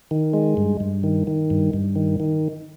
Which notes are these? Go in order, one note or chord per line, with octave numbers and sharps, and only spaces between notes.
D#3
G#3
G2
G2
D#3
D#3
G2
G2
D#3
D#3